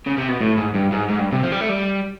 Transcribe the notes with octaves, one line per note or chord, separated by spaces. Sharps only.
C#3
C3
B2
A2
G#2
G2
G#2
G#2
G2
C3
F3
G3
A3
G3